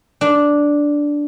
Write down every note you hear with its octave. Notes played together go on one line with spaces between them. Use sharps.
D4